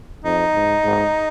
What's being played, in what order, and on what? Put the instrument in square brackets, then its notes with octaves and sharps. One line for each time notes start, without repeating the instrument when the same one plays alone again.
[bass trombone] F2 [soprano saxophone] D#4
[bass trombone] G#2
G#2